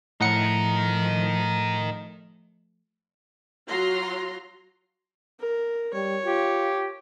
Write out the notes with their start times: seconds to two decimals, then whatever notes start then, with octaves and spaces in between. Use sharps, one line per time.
0.21 A2 F3 A3 D#4 A#4 F#5 C#7
3.68 F#3 F4 F#4 A#5 C6
5.40 A#4
5.93 G3 C#5
6.25 F4 G4